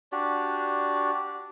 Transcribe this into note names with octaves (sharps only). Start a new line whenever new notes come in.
D4 F#4 G4 D5